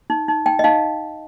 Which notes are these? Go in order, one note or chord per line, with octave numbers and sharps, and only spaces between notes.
D#4
D#4
D#4 G5
D#5
D#4 F5